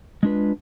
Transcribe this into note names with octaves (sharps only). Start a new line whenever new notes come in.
G#3 D4 F4 B4